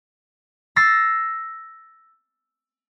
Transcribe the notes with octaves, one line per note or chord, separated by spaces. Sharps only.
E6 A6 A#6 C7